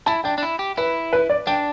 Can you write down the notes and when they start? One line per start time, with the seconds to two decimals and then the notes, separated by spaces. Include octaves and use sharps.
0.06 E4 A5
0.24 D4 G5
0.38 D4
0.43 E4
0.59 G4
0.77 E4 B4
1.13 B4
1.30 D5
1.47 D4 G5